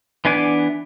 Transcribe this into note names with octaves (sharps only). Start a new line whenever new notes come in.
E3 B3 D4 G#5 D6